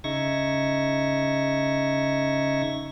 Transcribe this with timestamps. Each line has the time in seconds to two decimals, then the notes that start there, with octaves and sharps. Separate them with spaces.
0.04 C#3 D#4 E5 C#6 G#6 A#6